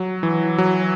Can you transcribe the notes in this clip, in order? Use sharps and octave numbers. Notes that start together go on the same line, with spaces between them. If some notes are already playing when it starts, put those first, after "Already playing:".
Already playing: F#3
E3
F#3